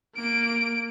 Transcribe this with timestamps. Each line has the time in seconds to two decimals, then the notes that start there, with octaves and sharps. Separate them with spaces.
0.16 A#3 D7